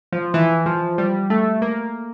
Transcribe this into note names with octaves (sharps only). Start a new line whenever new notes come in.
F3
E3
F3
G3
A3
A#3